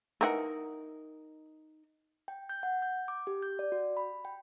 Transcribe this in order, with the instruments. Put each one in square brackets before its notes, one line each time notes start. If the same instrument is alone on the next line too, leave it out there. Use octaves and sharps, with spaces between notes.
[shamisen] E3 G4 F#5 [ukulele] D#4 A#4
[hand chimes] G5
G6
F#5
G6
D6
G4
G6
D5
F#4
B5
G5